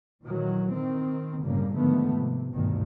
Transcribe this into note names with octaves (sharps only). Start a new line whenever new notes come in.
A#2 D#3 E3 F#3
D#3 C4
G1 A2 C#3 G3 A#3
G#2 D3 D#3 F3 A3 B3
C3
G1 D2 G2 B2 D#3